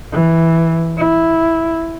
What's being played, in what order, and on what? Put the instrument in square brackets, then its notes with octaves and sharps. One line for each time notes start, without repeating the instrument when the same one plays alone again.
[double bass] E3
E4